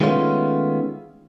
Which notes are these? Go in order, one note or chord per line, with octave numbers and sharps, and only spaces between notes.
D#3 G#3 A3 B3 C#4 F4